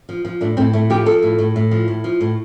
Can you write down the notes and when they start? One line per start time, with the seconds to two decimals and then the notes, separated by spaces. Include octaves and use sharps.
0.09 F3
0.25 F3
0.41 A2 D4
0.57 A2 C4
0.73 A2 A3
0.90 F3 G4
1.06 F3 A4
1.23 A2
1.38 A2
1.56 A2
1.71 F3
1.88 A2
2.04 F3
2.21 A2